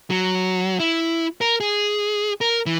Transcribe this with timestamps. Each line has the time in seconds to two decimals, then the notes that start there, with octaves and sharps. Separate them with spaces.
0.10 F#3
0.80 E4
1.41 A#4
1.60 G#4
2.41 A#4
2.66 E3